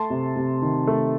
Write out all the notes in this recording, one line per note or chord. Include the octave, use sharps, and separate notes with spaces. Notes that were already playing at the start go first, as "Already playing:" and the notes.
Already playing: A3 A5 C6
C3
C3
D#3
A3